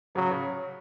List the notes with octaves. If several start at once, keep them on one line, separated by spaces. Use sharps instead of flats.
C#3 F#3
C#3